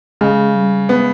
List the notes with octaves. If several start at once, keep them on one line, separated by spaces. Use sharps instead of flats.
C#3 G#3
G3
G#3 B3